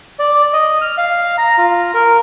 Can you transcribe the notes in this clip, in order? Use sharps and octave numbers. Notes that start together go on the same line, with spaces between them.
D5
D#5
F6
F5
A#5
F4
A#4